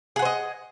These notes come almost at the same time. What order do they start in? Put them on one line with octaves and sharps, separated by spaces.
G#4 F#5 C5 D#5